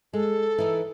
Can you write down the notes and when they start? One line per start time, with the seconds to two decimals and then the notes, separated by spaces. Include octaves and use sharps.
0.13 G#3 A4
0.58 E3 D#4